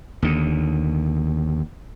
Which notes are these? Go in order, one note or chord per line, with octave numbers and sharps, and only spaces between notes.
D#2 D3